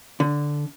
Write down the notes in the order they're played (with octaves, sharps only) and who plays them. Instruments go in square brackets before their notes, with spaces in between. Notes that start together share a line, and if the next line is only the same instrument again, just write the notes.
[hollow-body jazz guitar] D3